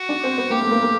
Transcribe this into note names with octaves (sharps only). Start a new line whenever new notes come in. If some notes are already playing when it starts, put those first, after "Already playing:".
Already playing: F#4
D4
C4
B3
A#3 G4
A3
A#3
A#3